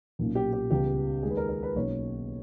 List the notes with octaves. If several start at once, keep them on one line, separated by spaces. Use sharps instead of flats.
B1 A#2 A#3 C#4
G4
G4
C#2 C#3 G3 B3 G4
D#2 D#3 G#3 G#4
B4
A#4
A#4
B4
B1 B2 A#3 C#4 C#5